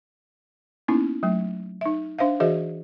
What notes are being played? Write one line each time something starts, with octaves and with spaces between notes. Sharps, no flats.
A#3 B3 C#4 D#4 E4
F#3 A3
D#4 E5
D4 C5 E5 F5
E3 F#4 G#4 C5 D#5 E5